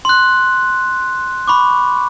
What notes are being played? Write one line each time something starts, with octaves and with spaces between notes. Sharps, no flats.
C6 F#6
B5 C#6 D6